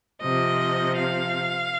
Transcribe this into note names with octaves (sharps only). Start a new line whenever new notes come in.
C3 F3 D#5
F5